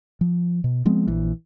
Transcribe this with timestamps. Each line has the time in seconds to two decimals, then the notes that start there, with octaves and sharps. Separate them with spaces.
0.21 F3
0.64 B2
0.85 F3 G#3 B3 C4
1.07 A#1 E3